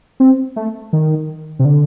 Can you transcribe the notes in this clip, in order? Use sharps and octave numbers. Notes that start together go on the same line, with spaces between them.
C4
A3
D#3
C3
D3